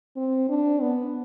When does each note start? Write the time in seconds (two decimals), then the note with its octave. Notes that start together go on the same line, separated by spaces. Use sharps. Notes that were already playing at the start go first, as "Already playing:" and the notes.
0.17 C4
0.49 D4
0.81 B3